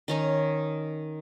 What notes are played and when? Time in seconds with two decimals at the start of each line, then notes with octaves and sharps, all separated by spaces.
0.08 D#3 C#4 D#4